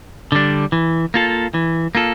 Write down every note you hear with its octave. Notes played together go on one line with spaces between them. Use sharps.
D3 G3 D4
E3
A#3 F4 A4
E3
A#3 F4 A4